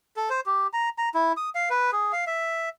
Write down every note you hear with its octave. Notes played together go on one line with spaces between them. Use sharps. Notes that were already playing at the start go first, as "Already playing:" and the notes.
A4
C5
G4
A#5
A#5
E4
D#6
F5
B4
G#4
F5
E5